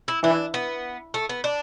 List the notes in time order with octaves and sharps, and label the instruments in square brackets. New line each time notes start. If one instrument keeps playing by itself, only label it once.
[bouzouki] E4
[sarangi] E3 [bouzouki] D4
[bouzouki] B3
A3
B3
D4